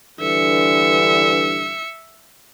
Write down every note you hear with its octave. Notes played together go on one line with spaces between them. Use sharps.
G2 D3 E3 E5 C#7